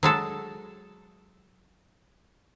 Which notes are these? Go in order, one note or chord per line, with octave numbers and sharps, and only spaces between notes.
F#3 G#3 A4